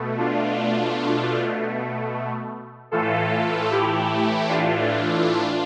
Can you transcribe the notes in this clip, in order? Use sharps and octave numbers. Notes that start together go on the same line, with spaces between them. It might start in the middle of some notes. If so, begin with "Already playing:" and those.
Already playing: B2 A3
D4 F4
A2 E3 A3 F4 A4
E4 G4
D4 F4